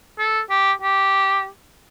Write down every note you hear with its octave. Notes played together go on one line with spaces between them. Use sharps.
A4
G4
G4